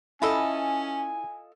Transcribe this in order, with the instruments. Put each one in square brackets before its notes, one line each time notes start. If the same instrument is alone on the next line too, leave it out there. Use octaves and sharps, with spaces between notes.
[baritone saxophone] C#4 [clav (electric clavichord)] E4 [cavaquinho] F4 A4 D#5 [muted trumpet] G#5